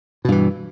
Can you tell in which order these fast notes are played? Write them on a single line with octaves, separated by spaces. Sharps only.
B2 G2 E3